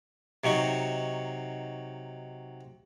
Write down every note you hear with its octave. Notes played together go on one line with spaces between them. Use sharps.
C3 F#3 D#4 C#6